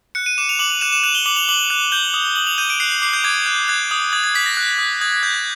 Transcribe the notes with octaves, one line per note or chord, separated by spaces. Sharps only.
F#6 C#7
D#7
D6 E7
F7
D6 F#7
F7
F#6 E7
E7
F#6 F7
G7
D6 F#7
F7
D6 F#7
F#6
G6 G7
D#6
D#6 F#7
F7
G6 D#7
D7
F#6 C7
C7
D6 C7
G6
D6 G#6
F#6
F#6 G#6
D#6
D#6 G#6
G#6
F#6 B6
A#6
F#6
D#6
D#6 G#6
G#6
F#6 G6
G#6